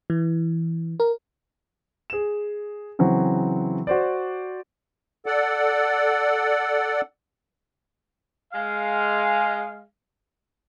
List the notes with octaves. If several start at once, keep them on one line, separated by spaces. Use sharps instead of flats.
E3
A#4
G#4 E7
C#3 E3 F#3 C4
F#4 C5 D5
A4 D5 F#5
G#3 F5